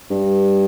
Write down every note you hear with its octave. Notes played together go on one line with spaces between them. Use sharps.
G2